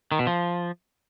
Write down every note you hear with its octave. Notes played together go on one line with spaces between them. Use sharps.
D#3
B2
F3